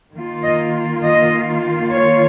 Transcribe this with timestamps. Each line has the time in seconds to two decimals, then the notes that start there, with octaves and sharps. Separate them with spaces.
0.14 D#3 A#3 F4
0.43 D#5
1.03 D#5
1.91 C#5